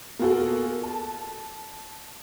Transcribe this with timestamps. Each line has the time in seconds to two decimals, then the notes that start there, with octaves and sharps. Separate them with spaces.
0.19 A#3 B3 F4 F#4 G#4 A4
0.83 A5